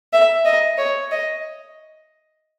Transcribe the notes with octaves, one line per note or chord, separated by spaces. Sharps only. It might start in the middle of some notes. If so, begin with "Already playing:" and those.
E5
D#5
C#5
D#5